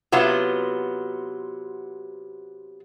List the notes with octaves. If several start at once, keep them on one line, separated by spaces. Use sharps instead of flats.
C3 F#3 B3 F4